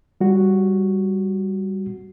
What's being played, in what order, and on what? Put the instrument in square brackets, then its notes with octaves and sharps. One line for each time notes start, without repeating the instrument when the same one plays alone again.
[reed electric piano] G3 F#4